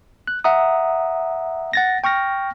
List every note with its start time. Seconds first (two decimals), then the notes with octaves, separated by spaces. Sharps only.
0.27 F#6
0.44 E5 F#5 A#5 D#6
1.73 F#5 A6 A#6
2.04 G5 C#6 F6 A#6